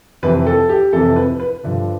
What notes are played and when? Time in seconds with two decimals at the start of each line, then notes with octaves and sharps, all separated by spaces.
0.23 F2 C3 E3 B4
0.46 A4
0.69 G4
0.93 F2 C3 E3 A4
1.16 B4
1.40 B4
1.63 G2 D3 F3